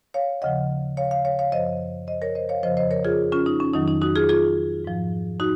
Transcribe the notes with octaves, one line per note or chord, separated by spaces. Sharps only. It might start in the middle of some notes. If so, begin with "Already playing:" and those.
C#5 F5
D#2 C#3 F3 D#5 F#5
C#5 F5
C#5 F5
C#5 F5
C#5 F5
F#2 F3 C5 D#5
C5 D#5
A#4 C#5
C5 D#5
C#5 F5
F2 C#3 F3 C5 D#5
C5 D#5
A#4 C#5
F4 G#4
C#4 F4
D#4
C#4
F2 D#3 F#3 D#4
D#4
D#4 F#4
F4 G#4
F4 G#4
G#2 F3
D#4 F#4